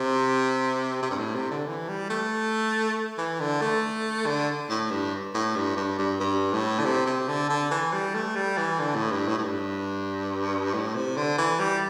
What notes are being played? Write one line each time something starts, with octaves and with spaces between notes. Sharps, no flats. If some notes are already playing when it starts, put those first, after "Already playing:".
Already playing: C3
C3
G2
A2
C3
D3
E3
G3
A3
E3
D3
A3
D3
A2
G2
A2
G2
G2
G2
G2
A2
D3
C3
C3
D3
D3
E3
G3
A3
G3
E3
D3
A2
G2
A2
A2
G2
A2
C3
D3
E3
G3